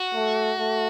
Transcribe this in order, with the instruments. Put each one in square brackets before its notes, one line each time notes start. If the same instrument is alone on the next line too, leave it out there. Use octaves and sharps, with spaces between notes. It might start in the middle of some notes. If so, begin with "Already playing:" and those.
Already playing: [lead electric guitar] F#4
[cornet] A3
A3